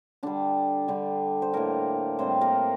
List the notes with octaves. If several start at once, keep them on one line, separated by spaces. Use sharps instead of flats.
D3 G3 D4
D3 G3
C5
A2 G3 A#3 A#4
A2 G3 C4 C5
A#3 A#4